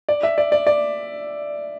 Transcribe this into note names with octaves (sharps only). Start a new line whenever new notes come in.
D5
E5
D5
D5
D5